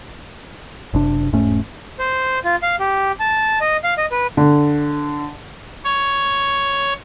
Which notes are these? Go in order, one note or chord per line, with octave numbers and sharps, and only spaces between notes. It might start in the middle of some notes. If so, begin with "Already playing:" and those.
F#1 C3 D4
E1 G#2 A3 C#4
C5
F4
F5
G4
A5
D#5
F5
D#5
B4
D3
C#5